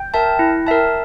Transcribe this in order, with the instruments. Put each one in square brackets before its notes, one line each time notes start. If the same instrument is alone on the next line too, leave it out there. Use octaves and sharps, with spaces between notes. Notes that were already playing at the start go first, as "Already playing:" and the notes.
Already playing: [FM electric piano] G5
[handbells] A#4 E5 A5
E4
A#4 E5 A5